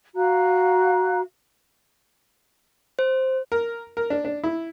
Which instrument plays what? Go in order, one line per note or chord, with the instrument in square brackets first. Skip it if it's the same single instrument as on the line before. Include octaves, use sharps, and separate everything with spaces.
[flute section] F#4 F5 A#5 F#6
[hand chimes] C5
[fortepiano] A#4
A#4
D4
D4
E4